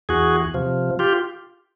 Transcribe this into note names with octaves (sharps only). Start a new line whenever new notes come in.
E2 F#4 G#4
C3 F3
F4 G4